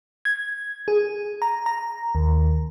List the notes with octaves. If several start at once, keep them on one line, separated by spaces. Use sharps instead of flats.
G#6
G#4
A#5
A#5
D#2